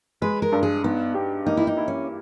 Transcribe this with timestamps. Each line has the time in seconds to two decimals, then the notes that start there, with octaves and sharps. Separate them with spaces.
0.22 G#3 B4
0.42 A#4
0.52 G2
0.63 G#4
0.84 B3 D#4
1.14 G4
1.46 A#3 D#4
1.57 E4
1.67 D#4
1.77 E4
1.88 C#4